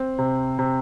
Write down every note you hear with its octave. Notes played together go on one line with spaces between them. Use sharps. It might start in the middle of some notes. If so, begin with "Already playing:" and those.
Already playing: C4
C3
C3